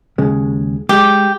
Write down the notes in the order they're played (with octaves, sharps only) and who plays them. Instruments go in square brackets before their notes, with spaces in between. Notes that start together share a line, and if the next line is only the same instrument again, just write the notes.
[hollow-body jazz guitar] D#2 C#3 G#3
[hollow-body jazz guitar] G#3 [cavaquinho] G4